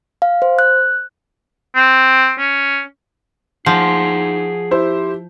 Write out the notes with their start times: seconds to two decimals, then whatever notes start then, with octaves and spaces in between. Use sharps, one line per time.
0.22 F5
0.42 C5
0.59 F#6
1.75 C4
2.39 C#4
3.66 F3 D#4 G#4 F#5
4.71 E4 G4 C5